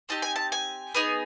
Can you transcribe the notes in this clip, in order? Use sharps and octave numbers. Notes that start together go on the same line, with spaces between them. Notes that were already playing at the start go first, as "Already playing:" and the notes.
C4 D#4 G4 A5
G#5
A5
G#5
B3 D#4 G#4